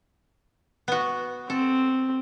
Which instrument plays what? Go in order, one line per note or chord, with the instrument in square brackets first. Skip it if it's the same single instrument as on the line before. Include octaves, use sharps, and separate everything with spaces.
[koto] B3 F#4
[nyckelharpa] C4 [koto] A4